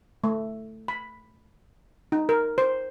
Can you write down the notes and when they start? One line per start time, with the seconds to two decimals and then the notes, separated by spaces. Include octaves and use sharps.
0.24 A3
0.88 B5
2.12 D#4
2.29 A#4
2.58 C5